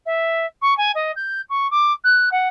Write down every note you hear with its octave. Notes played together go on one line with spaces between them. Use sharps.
E5
C#6
G#5
D#5
G6
C#6
D6
F#6
F#5